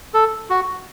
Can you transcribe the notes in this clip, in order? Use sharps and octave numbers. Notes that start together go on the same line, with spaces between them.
A4
F#4